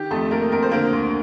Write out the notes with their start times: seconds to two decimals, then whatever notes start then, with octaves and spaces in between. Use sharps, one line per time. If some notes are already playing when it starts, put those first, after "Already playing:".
Already playing: D#3 G4
0.11 F2 A3 A4
0.31 A3 A#3 A#4
0.52 F2 A#4
0.62 C5
0.71 D3 A#3 A#4
0.93 D2